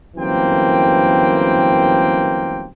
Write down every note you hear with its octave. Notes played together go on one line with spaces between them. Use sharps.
G1 F#2 E3 A#3 C4 G5